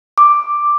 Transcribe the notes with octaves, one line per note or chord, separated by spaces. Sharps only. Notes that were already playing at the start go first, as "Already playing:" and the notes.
D6